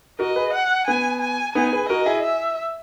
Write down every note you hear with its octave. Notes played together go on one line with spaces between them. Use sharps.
F#4 A#4 D#5
G#4 B4
F#5
B3 G#5
G#5
B3 D#4 G#5
G#4 B4
F#4 A#4 D#5
E4 G#4
E5